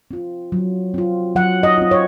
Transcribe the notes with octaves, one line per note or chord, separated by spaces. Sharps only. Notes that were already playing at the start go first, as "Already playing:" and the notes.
C4 F4
F#3
C4 F4
F#3 F#5
D#5
C4 F4
C#5